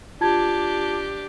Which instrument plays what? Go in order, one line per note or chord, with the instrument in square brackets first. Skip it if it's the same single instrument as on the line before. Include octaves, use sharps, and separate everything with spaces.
[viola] D4 G4 [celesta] F4 A5 G#6